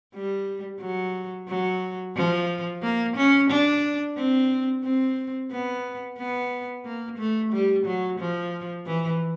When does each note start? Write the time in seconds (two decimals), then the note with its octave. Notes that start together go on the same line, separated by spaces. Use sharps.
0.15 G3
0.81 F#3
1.49 F#3
2.16 F3
2.83 A#3
3.16 C#4
3.50 D4
4.17 C4
4.84 C4
5.51 B3
6.18 B3
6.85 A#3
7.18 A3
7.52 G3
7.86 F#3
8.19 F3
8.86 E3